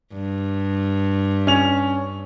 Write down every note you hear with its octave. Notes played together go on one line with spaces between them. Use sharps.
G2
C#4 F7